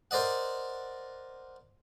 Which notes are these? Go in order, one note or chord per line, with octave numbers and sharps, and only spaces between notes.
A#4 C5 D5 D#5 F#5